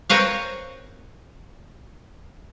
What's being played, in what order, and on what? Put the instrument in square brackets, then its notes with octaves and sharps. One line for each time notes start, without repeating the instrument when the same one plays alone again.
[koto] C4 A#4 B4 C#5 F5